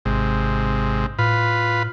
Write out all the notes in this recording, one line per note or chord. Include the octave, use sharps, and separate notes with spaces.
G#1 G#2 C3
A2 F4 B4